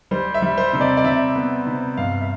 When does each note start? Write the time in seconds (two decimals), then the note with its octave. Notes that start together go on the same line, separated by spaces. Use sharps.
0.11 G3 C5
0.34 E5
0.42 G3
0.58 C5
0.73 C3
0.81 D5
0.97 D5
1.04 C3 E5
1.36 B3
1.67 C3
1.98 G2 F5
2.21 E5